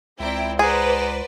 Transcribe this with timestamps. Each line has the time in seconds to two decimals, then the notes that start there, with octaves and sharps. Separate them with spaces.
0.20 C#2 C4 E4 D5 G5 A#5
0.59 G#4 B4 C5 D5 F#5 A#5